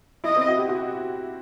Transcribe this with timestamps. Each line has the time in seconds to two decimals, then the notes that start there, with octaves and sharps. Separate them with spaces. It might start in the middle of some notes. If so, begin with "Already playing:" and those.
0.24 E4 D#5
0.37 C4
0.48 F#4
0.58 G4
0.69 F#4